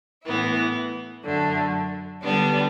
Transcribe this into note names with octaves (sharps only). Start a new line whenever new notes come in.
A2 E3 B3 E4
F#2 D3 A3
D3 G3 B3 D4